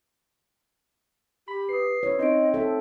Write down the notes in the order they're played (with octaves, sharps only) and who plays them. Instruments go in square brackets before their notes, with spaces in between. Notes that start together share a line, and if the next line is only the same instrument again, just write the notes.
[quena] G4 [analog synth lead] B5
[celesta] B4 D#6 [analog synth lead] C7
[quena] E4 [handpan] C#5
[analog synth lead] C4 [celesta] D#4 D7 [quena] D#5
[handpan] A4 [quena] E5